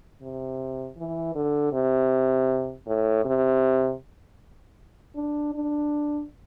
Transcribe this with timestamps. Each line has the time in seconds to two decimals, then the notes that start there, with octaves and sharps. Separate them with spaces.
0.22 C3
0.97 E3
1.35 D3
1.73 C3
2.87 A2
3.25 C3
5.16 D4
5.54 D4